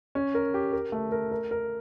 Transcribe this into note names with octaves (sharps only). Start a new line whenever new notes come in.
C#4
A#4
G4
A#4
A3
A#4
A#4
A#4